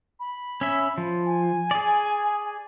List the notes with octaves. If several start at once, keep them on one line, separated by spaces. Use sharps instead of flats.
B5
C#4 E5
F3
G#5
G#4 D5